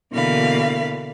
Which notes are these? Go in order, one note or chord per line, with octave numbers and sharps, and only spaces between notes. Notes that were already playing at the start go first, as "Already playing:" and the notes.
B2 D3 E3 A#3 F5 B5